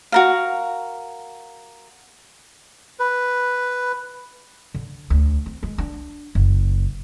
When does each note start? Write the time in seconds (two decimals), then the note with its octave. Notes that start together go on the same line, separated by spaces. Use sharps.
0.12 F#4 A#4 F5
2.99 B4
4.74 D3
5.10 D2
5.46 C4
5.63 G#3
5.78 D4
6.35 F#1